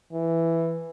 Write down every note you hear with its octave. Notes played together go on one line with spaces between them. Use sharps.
E3